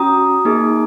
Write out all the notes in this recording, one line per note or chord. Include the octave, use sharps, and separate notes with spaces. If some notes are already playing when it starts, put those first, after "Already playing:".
Already playing: C#4 F#4 A#5 D#6
A#3 D#4 G#4